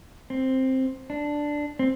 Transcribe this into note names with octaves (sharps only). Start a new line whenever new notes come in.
C4
D4
C4